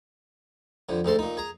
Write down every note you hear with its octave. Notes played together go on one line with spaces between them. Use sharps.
F2 D3
D2 G#2 A4 C6
A#2 D#4
G#4 A#5